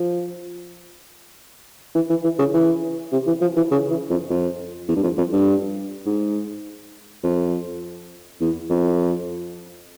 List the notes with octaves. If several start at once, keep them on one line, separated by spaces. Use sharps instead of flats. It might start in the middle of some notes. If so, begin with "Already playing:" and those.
Already playing: F3
E3
E3
E3
C#3
E3
C3
E3
F3
E3
C#3
E3
F2
F2
E2
G2
F2
F2
G2
G#2
F2
E2
F2